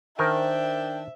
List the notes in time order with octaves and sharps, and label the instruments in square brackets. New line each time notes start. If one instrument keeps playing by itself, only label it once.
[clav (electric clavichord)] D#3 A#4 G#5 [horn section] D4 G5 [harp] C5 [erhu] E5